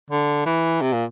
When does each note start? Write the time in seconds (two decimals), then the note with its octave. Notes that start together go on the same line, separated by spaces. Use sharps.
0.10 D3
0.46 E3
0.81 C3
0.93 A#2